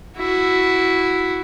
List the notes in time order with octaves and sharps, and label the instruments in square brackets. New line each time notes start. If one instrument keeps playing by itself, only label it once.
[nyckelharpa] E4 F#4